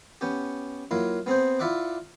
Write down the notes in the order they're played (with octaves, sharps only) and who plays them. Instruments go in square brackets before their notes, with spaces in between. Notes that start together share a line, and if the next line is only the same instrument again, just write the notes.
[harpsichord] B3 C#4 G4
F#3 A#3 E4 F4
B3 C4 G#4 C5
E4 F4 D5 E5 F#5 D6